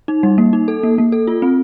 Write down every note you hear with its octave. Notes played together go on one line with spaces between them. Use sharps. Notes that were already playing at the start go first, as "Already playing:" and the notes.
D#4
G3
A#3
D#4
A4
A#3
A#3
A4
F4
C4